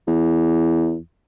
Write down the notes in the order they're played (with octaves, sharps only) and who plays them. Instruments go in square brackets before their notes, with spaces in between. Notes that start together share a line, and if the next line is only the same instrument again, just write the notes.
[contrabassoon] E2